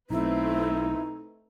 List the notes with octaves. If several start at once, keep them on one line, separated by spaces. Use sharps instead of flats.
B1 A3 C4 D#4 E4 B4